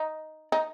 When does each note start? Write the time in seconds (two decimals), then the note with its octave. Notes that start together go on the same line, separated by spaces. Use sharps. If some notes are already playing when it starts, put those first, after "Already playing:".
Already playing: D#4
0.52 D#4